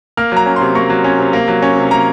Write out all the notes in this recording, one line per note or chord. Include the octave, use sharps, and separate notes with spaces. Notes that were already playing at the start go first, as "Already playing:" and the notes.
A#3 F6
F#3 A#5
C#4
C3 C6
A#3 C#6
F#3
C#4
C3
A#3
F#3
C#4
C3
A#3 A#5